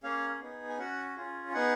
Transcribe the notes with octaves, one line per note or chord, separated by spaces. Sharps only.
A#3 C#4 G#4 F5
B3 D#4 G#4
G#5
C#4 F#4 F#5
C#4 F4 G#4
B3 D#4 G#4 F#5